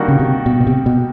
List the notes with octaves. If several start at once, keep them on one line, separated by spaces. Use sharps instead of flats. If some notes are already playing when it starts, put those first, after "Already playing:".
Already playing: D#3 G3 A#3 D4 F#4
C#3
C3
B2
B2
C3
B2